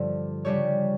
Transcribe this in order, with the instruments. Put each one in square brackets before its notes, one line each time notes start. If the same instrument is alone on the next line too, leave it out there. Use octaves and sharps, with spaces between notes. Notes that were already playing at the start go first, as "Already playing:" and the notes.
Already playing: [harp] G2 D3 F3
C#3 G3 D4 G4 C#5